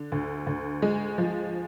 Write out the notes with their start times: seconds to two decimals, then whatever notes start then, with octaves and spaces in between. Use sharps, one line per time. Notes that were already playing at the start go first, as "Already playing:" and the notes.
Already playing: D3
0.12 D2
0.47 D2
0.82 G#3
1.18 F3